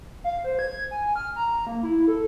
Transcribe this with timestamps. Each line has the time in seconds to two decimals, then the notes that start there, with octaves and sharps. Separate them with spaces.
0.24 F5
0.44 C5
0.59 G#6
0.91 G#5
1.16 F6
1.36 A#5
1.67 A#3
1.83 E4
2.07 A4